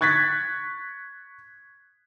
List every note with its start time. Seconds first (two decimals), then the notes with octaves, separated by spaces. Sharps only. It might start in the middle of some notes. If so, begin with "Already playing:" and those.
0.01 C#6 F#6 G#6 A6 B6